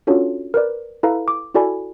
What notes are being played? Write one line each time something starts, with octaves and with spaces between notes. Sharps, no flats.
C#4 D4 F4 F#4 A4 C#5
A#4 B4 D5
E4 A4 B4 F5 A#5
D6
E4 F#4 A4 D5 G#5 B5